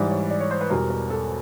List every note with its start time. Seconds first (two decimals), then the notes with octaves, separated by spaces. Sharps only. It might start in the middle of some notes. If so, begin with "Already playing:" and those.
Already playing: G#2 E3 G3 D5
0.11 C#5
0.31 D5
0.40 C#5
0.51 C5
0.61 B4
0.70 E2 B2 G3 A#4
0.90 A#4
1.10 A4